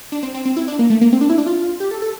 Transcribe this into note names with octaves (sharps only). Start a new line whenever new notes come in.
D4
C4
C4
C4
E4
D4
A#3
A3
A#3
C4
D4
E4
D4
F4
G4
A4
A4